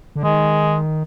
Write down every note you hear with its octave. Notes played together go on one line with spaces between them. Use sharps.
D3
D#3 G#3